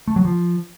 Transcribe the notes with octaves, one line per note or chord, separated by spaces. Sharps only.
A3
F#3
F3